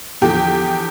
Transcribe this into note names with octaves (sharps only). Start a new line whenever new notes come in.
E2 D3 F3 G4